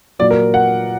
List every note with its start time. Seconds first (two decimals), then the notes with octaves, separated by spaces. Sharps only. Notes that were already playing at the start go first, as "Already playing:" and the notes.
0.19 A#2 F#3 D5
0.31 A#4
0.54 F#5